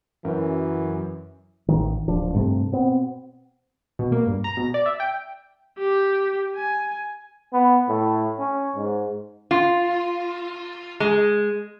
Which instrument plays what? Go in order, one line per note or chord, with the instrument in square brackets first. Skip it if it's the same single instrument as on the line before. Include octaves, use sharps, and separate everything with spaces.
[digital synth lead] F#2 [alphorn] E3
[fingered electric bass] A1 D#3
D1 F3 D4
G2 C3 A3
B2 B3 C4
[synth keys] B2
A#3
G2
A#5
B2
D5
E5
G5
[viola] G4
G#5
[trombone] B3
A2
C#4
G#2
[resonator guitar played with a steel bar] F4
G#3